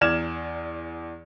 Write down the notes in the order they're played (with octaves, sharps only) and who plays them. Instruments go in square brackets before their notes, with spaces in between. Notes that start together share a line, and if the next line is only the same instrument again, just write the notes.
[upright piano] E2 D5 F6 G#6 E7